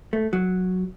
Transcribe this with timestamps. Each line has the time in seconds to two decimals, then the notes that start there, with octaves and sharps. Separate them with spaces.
0.13 A3
0.33 F#3